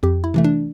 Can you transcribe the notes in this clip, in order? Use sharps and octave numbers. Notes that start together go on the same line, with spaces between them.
F2 G4
E4
C3 E3 A3
D4